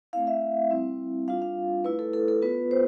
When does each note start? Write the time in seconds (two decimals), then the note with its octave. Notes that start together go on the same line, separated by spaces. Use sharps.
0.13 A3 C4 E4 F5
0.27 E5
0.70 G3 C4 E4
1.28 G3 D4 F4 F5
1.42 F5
1.85 A3 E4 B4
1.99 A4
2.13 A4
2.28 A4
2.42 B3 F4 B4
2.71 C5